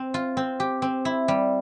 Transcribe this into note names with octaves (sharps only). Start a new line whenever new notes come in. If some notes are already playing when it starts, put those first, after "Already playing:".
Already playing: C4
F4
C4
G4
C4
E4
G3